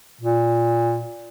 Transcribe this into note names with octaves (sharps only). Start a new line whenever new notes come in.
A#2